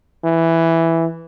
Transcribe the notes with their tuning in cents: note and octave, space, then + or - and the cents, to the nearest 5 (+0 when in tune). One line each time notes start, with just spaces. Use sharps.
E3 +0